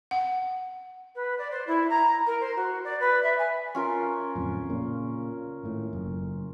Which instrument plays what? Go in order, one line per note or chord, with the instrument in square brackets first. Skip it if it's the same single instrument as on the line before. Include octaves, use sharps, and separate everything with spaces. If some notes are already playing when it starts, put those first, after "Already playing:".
[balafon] F#5
[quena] B4
D5
C5
E4
A#5
A#4
C5
F#4
D5
B4
E5
G#5
[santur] C#4 F4 A#4
[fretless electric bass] D1 F2
A#2 C#3
G#1 A2
F#1